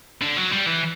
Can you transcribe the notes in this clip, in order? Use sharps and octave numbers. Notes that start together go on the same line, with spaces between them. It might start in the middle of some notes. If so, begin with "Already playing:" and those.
D3
F#3
G3
E3